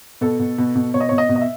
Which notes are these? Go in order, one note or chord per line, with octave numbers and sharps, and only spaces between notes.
B2 A4
B2
B2
B2
B2 C#5
D#5
B2 C#5
D#5
B2
D#5
E5